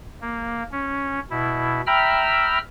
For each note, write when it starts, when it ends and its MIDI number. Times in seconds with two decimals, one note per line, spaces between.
0.21 0.63 58
0.72 1.20 61
1.30 1.81 47
1.30 1.81 64
1.87 2.58 76
1.87 2.58 79
1.87 2.58 82
1.87 2.58 83
1.87 2.58 88
1.87 2.58 89